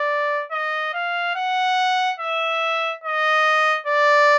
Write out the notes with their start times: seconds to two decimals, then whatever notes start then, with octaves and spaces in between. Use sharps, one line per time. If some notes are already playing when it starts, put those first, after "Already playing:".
Already playing: D5
0.52 D#5
0.93 F5
1.35 F#5
2.19 E5
3.04 D#5
3.87 D5